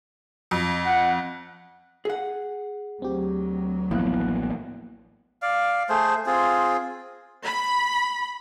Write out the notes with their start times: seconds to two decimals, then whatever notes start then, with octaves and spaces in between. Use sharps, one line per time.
0.51 F2
0.84 F#5
2.05 G#4 F#5
3.02 D2 F#3 C4 G4
3.91 A1 F3 A#3 B3 E4 F#6
5.42 D5 F5
5.89 A3 G#4 C5
6.26 C4 F4 G#4
7.45 B5